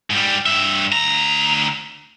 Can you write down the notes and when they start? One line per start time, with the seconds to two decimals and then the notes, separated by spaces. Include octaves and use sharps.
0.10 G#2 G3
0.46 G2 E5
0.92 D2 A#5